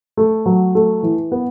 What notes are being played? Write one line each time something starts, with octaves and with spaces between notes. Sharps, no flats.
A3
F#3
A3
E3
B3